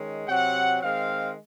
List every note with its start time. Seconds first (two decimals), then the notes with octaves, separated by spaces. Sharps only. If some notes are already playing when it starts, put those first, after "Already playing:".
Already playing: D#3 G#3 C#4
0.28 C3 F#3 C4 F#5
0.82 D#3 G#3 C4 F5